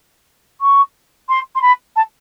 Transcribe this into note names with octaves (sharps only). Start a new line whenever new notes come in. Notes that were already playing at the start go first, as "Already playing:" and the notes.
C#6
C6
C6
B5
A5